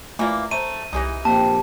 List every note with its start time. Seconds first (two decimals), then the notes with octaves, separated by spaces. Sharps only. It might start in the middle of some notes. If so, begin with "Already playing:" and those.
0.19 E3 A3 A#3 F4 D5
0.51 A3 C5 A#5 D#7
0.93 C2 E3 G#3 D#4 G4 A#6
1.25 A#1 A#3 C4 G4 A5